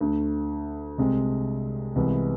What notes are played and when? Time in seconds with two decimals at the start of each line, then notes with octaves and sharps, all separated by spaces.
0.01 D2 D3 A3
0.98 C2 C3 G#3
1.96 C2 C3 E3 G#3 B3